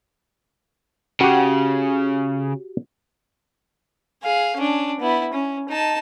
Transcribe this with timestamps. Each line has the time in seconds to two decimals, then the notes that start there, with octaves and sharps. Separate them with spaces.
1.21 C#3 F#4 G4
4.23 G#4 F5
4.57 C#4 D4
5.00 B3 E4
5.33 C#4
5.69 D#4 A5